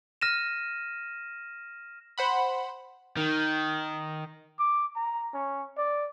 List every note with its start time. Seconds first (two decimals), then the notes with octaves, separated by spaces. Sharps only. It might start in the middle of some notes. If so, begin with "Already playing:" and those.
0.22 F6 A#6 D#7 E7
2.18 C5 F#5 B5
3.17 D#3
4.59 D6
4.96 A#5
5.34 C#4
5.77 D5